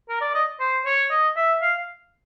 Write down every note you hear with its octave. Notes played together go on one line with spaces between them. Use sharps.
A#4
D5
D#5
C5
C#5
D#5
E5
F5